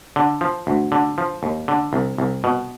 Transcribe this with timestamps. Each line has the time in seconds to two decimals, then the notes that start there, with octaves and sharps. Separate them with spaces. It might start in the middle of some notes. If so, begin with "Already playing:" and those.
0.16 D3
0.41 F3
0.67 D2
0.92 D3
1.18 F3
1.43 D#2
1.68 D3
1.93 C2
2.18 C2
2.44 B2